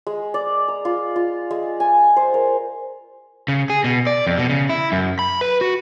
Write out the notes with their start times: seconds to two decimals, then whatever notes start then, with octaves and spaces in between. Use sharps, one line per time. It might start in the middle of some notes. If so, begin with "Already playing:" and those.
0.07 G#3
0.34 D5
0.68 A#5
0.85 F4
1.16 F4
1.51 G#3
1.80 G#5
2.16 C5
2.34 A#4
3.48 C#3
3.70 G#4
3.84 B2
4.07 D5
4.27 F2
4.38 B2
4.49 C#3
4.70 E4
4.92 F#2
5.19 B5
5.41 B4
5.61 F#4